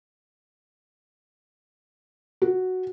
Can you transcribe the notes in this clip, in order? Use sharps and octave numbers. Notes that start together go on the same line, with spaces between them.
F#4